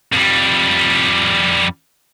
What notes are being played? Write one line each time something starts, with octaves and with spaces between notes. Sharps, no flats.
F2 G3